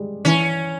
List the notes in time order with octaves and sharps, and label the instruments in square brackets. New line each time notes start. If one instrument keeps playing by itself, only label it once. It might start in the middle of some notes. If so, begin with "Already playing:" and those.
Already playing: [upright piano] G3 G#3
[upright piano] E3 [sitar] C#4